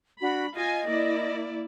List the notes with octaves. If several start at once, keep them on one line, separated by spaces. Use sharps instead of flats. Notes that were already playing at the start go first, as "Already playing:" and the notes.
D4 F#4 B5
F4 D#5 G#5
A#3 E4 D5